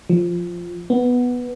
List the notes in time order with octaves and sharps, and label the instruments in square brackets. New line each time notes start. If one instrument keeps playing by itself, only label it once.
[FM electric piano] F3
B3